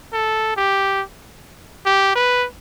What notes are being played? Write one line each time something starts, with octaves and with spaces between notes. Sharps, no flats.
A4
G4
G4
B4